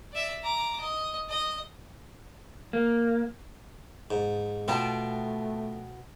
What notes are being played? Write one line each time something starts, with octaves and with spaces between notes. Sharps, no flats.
D5 E5
A#5 D6
D#5
D#5
A#3
G#2
B2 A3 B3 F4 G5 A5